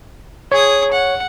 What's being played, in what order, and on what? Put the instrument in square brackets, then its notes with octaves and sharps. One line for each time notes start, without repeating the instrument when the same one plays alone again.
[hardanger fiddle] G#4 D#6 [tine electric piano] C#5
[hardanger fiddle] F#5